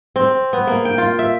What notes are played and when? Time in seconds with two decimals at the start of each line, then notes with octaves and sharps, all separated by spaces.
0.16 C4
0.53 B3
0.67 A#3
0.85 G5
0.98 F4
1.19 E5